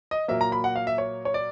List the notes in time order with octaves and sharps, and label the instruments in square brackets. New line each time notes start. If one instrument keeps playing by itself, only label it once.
[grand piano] D#5
A#2 F#3 A#3 E5
A#5
B5
F#5
F5
E5
C#5
C#5
D5